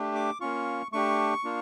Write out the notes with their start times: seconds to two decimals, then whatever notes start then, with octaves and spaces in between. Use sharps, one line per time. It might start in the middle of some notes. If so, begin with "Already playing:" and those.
Already playing: A3 D4 G4
0.15 D6
0.40 A#3 C#4 F4 C#6
0.92 A3 D4 G4 C#6
1.44 A#3 D4 F4